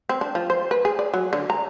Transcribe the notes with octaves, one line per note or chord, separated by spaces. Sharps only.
C4
D4
F3
C5
B4
G#4
D5
F#3
D3
A#5